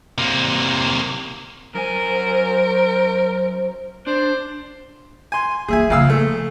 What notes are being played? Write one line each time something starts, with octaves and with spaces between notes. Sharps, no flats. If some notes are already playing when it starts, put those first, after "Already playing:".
C3 A#3
F#2 A#4 C5 G#5
D4 C5
G#5 C6
A#3 F4 G#4 E5 G#5
A#1 C#3 A#3 F5 E6
A3